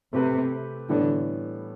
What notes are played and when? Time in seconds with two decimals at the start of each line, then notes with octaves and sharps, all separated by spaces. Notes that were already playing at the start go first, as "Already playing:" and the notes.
0.13 C3 A3 C4 G4 B4
0.89 A2 D3 E3 G3 B3